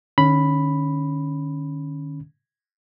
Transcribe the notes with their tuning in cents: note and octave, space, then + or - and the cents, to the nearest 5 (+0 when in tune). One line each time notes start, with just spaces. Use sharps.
D#3 -45 C#4 +0 B5 +0